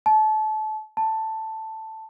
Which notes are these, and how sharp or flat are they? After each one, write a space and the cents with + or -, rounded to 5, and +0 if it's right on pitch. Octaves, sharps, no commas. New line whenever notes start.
A5 -30
A5 +5